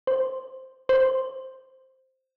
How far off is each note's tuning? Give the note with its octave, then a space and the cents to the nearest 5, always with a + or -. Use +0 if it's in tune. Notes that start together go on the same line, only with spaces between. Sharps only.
C5 +0
C5 +0